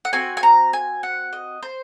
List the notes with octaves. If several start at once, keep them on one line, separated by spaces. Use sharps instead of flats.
F#5
C4 F#4 G#5
G#5
A#5
G#5
F#5
D#5
C5